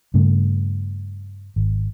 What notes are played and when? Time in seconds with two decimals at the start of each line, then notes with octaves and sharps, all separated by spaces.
0.14 G2 C#3 A3
1.56 G#1